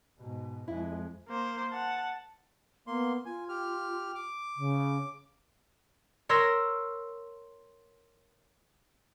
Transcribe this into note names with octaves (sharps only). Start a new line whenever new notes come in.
G#2 B2
F2 G#3 E4
A#3 C5
F#5 A5
A#3 B3 C6
F4 G#5
G4 F6
D6
C#3
A#4 C#5 C6 E6 A#6